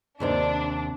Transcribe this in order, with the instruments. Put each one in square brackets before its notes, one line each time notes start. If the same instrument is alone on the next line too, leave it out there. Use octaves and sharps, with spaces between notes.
[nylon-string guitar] D#2 C3 C5 [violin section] D4